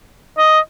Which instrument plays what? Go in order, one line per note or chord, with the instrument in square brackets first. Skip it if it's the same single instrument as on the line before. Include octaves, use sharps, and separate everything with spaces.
[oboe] D#5